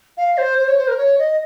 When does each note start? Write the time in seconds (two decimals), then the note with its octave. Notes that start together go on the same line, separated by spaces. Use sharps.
0.17 F5
0.38 C5
0.58 C5
0.68 C#5
0.78 C5
0.88 A#4
0.98 C#5
1.18 D#5